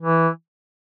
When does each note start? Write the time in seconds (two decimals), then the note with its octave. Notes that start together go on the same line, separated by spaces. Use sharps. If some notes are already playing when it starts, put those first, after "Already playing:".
0.01 E3